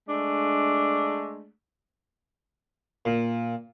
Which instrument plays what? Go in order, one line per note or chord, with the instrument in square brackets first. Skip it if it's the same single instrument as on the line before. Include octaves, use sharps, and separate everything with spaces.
[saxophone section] G#3 A3 D4
[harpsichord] A#2